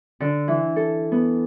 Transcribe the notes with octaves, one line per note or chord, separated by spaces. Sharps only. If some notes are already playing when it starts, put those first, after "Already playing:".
D3
E3
A4
B3